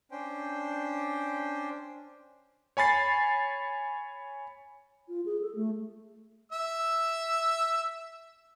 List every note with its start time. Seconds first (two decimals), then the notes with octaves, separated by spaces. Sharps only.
0.11 C#4 D4 C5 G5
2.77 C#5 G#5 B5 A6 C7
5.08 F4
5.26 G#4
5.41 A4
5.55 A3
6.52 E5 E6